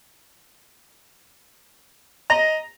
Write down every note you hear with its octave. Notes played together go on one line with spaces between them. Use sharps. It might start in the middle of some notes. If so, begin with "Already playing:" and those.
D#5 A#5